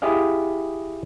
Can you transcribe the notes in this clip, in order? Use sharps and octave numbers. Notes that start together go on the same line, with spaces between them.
E4 G4 G#4 D#5 F5